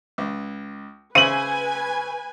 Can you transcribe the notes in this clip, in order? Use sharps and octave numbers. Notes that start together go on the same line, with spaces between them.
C#2
C#3 B4 C5 E5 G#5 D#7 F#7